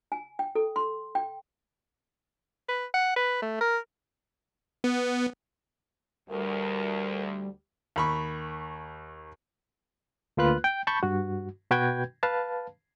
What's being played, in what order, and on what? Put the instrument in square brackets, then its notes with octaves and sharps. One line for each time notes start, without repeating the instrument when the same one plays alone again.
[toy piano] G#5
G5
A4
C6
G5
[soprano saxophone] B4
F#5
B4
A3
A#4
[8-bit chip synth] B3
[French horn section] D2 [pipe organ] G3 [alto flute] A#4
[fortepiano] D#2 B5 C#6
[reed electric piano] D2 A#3 F4 B4 F#6
G5
A5 B5 C#6 G6
G2 F#4
B2 F#4 B4 G5 G6 G#6
B4 F5 A5